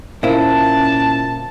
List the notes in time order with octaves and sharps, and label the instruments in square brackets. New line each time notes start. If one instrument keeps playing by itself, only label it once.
[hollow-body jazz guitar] A#2 E4 [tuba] C#4 [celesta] A#4 C5 F5 [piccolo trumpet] A5